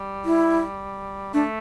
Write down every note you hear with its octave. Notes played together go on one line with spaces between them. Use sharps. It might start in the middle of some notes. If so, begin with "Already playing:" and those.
Already playing: G3
E4
A3 D4